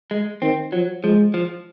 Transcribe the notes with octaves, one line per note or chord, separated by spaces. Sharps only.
G#3
D#3 C4
F3 F#3
F3 G#3
F3